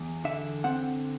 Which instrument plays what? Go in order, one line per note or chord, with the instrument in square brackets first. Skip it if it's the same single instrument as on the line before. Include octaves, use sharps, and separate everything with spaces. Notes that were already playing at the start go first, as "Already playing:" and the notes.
Already playing: [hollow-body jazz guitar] E2
D3 E5
C4 F#5